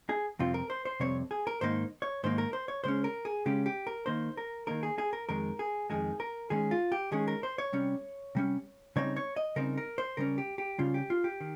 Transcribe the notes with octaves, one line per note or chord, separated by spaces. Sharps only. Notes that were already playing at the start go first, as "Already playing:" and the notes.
G#4
F2 C3 G3 C4 F4
A#4
C5
C5
F2 C3 G3 C4 C#5
G#4
A#4
G#2 D#3 A#3 D#4 C5
C#5
G#2 D#3 A#3 D#4 C5
A#4
C5
C#5
C#3 G#3 C#4 C5
A#4
G#4
C#3 G#3 C#4 G4
G4
A#4
D#3 A#3 D#4 C5
A#4
D#3 A#3 D#4 A#4
G#4
G#4
A#4
F2 D#3 G#3 A#4
G#4
F2 D#3 G#3 G#4
A#4
D#3 G#3 C#4 G#4
F4
G4
D#3 G#3 C#4 G#4
A#4
C5
C#5
C3 G3 C#4
C3 G3 C#4
C#3 G3 C4 D#4 C#5
C#5
D#5
C#3 G3 C4 D#4 A#4
A#4
C5
C#3 G3 C#4 A#4
G4
G4
C#3 G3 C#4 F4
G4
F4
G4
D#3